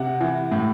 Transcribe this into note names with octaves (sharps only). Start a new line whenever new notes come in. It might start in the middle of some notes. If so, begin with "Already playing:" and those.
Already playing: C3 F#5
E3
A2